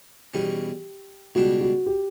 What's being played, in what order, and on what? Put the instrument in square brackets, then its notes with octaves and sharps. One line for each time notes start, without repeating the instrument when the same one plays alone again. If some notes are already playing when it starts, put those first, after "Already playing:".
[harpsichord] E2 B2 G3 C#4 [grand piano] G4
[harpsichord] C#2 B2 G3 D4 [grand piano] F#4
[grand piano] F#4
G4